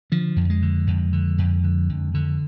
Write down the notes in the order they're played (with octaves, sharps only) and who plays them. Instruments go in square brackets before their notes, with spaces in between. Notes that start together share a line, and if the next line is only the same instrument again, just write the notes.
[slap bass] D3 F3
F2
G#3
D3
F2
D3
F2
D3
F2
D3